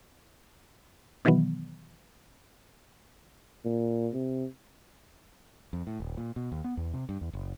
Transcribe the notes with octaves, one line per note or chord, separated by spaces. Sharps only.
B2 D#3 E3 F#3 B3
A#2
C3
F2
A2
D#1
A#2
B2
D#2
B3
E2
C3
G2
E2
F#1